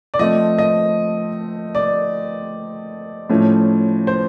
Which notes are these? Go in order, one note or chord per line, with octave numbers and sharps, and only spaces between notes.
D5
F3 A3 C4 D#5
D#5
D5
A2 F3 A3 C#4
C5